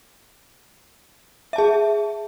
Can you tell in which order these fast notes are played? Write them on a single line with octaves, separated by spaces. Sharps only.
E5 A5 G#4